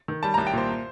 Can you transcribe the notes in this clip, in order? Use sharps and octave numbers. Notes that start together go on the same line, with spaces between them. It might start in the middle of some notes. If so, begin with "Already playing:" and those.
D#3
G3 A5
C2 A#5
G5
A#2 C5